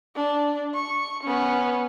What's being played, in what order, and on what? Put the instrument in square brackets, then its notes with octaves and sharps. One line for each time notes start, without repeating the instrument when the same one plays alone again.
[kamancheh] D4
C#6
B3 C#4